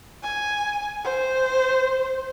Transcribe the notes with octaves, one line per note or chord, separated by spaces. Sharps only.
G#5
C5